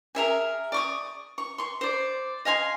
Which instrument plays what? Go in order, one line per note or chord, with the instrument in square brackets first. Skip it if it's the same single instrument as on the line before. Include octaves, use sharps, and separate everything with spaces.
[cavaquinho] G#4 A#4 E5 G#5
D5 C#6 D#6
C#6
C6 C#6
C5 D5
D#5 F5 G#5 C6